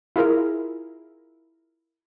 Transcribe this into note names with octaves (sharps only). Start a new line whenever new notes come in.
E4 F4 G#4 A#4